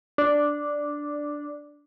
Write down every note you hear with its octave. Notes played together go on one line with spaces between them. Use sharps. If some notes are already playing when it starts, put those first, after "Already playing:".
D4